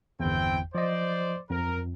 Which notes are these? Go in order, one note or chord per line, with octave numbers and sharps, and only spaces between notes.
G1 E2 C4 E4 G5
F3 C5 D5 D#5
F2 A#4